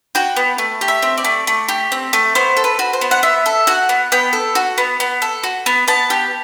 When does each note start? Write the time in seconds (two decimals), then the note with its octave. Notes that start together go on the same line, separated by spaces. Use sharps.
0.15 F#4 G5
0.36 B3
0.58 A3
0.81 G4
0.88 E5
1.02 C4
1.18 D5
1.24 A3
1.47 A3
1.68 G4
1.92 C4
2.13 A3
2.35 B3 C5
2.57 A4
2.64 B4
2.79 F#4
2.93 C5
3.01 B3
3.11 F#5
3.23 B3 E5
3.46 A4
3.67 F#4 F#5
3.89 B3
4.12 B3 G5
4.33 A4
4.55 F#4
4.78 B3
5.00 B3
5.22 A4
5.43 F#4
5.66 B3
5.88 B3 A5
6.10 G4